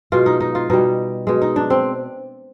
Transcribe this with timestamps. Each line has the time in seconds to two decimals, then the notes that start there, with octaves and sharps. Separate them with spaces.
0.12 B2 G#3 F4
0.26 D#4
0.40 D#4
0.55 F4
0.70 B2 G3 D#4
1.27 B2 G#3
1.42 D#4
1.56 D4
1.70 C4